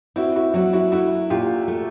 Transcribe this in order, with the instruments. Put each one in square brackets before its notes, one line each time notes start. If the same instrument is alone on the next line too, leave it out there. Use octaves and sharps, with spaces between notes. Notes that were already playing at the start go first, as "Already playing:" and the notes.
[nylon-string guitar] C4 [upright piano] E4 F#4
[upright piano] E4 F#4
[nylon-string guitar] F#3 [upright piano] E4 F#4
[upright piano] E4 F#4
[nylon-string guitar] A3 [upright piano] E4 F#4
[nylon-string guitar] A#2 [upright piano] F4 G4
[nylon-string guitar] A3